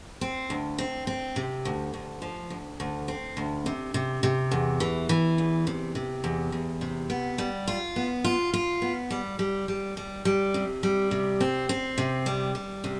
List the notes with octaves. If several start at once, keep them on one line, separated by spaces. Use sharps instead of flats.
C4
D2
C4
C4
C3
D2
D2
F3
D2
D2
C4
D2
C3
C3
C3
E2
E3
E3
E2
C3
C3
E2
E2
C3
B3
G3
F4
B3
F4
F4
B3
G3
G3
G3
G3
G3
C3
G3
C3
C4
C4
C3
G3
G3
C3